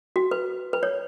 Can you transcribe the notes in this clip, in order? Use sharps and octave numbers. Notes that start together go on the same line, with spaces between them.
F#4
B4
B4
C#5